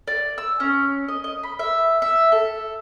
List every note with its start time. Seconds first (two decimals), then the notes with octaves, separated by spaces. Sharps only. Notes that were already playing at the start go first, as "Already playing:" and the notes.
0.08 D5
0.38 E6
0.60 C#4
1.08 D#5
1.24 D#5
1.43 B5
1.59 E5
2.02 E5
2.32 A4